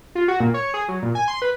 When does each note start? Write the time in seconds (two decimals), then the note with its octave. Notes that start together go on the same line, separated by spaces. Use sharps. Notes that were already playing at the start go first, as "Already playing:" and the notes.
0.15 F4
0.28 F#4
0.40 A#2
0.54 C#5
0.74 G#4
0.89 F#3
1.03 A#2
1.15 G#5
1.28 C6
1.42 B4